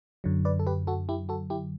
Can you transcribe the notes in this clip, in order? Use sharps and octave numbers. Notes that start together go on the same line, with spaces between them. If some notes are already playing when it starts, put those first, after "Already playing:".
F#2 D3 F#3
B4 D5
A4
G4 B4
F#4 A4
E4 G4
F#4 A4
E4 G4